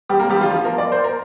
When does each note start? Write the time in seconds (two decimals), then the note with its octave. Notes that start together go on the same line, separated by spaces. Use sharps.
0.09 G3 G4
0.19 A#3 A#4
0.29 G3 G4
0.40 F3 F4
0.51 F3 F4
0.64 A#3 A#4
0.78 D5
0.92 C5
1.04 A#4